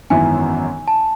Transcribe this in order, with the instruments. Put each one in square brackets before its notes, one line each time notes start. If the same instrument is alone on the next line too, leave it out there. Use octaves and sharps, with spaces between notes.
[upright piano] G#1 F#2 E3 B3 E4 [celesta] G#5
[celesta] A5